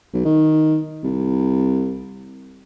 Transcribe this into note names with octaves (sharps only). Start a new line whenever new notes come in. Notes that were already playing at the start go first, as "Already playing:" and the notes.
B1
D#3
C2